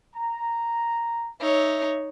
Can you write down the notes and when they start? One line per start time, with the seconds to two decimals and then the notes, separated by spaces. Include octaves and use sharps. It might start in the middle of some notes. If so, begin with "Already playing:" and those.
0.15 A#5
1.41 D#4 C#5 E5